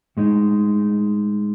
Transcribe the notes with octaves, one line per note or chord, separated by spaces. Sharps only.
A2 G#3 D#4